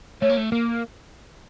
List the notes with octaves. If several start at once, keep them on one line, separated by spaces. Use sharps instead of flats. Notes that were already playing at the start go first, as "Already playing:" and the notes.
A3 C#5
A#3
A3
A#3